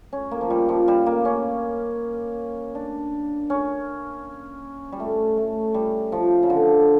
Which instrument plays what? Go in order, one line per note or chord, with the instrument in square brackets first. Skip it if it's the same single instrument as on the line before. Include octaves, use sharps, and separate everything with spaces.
[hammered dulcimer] C#4
A#3
F3
G3
F3
G3
A#3
C#4
D4
C#4
G3
A3
A3
G3
F3
C#3
D3